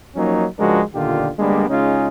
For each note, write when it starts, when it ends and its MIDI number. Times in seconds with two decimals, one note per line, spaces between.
0.15 0.45 53
0.15 0.45 54
0.15 0.45 58
0.15 0.45 61
0.15 0.45 63
0.59 0.81 37
0.59 0.81 53
0.59 0.81 56
0.59 0.81 62
0.59 0.81 66
0.59 0.81 70
0.93 1.29 35
0.93 1.29 46
0.93 1.29 50
0.93 1.29 51
0.93 1.29 65
0.93 1.29 67
1.39 1.68 50
1.39 1.68 55
1.39 1.68 56
1.39 1.68 58
1.39 1.68 59
1.39 1.68 62
1.69 2.08 49
1.69 2.08 56
1.69 2.08 61
1.69 2.08 63
1.69 2.08 65
1.69 2.08 68